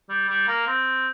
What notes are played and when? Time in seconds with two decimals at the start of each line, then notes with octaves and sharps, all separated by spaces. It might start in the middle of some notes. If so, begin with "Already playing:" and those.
0.09 G3
0.29 G3
0.47 A#3
0.67 C4